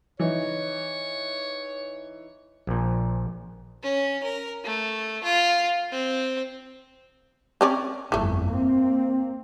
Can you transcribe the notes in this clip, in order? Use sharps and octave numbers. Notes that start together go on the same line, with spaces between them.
E3 D#4 C#5
A#1 A#2
C#4
A#4
A3
F4
C4
C4 C#4 D5
G1 F2 E3 A3
A#3 C4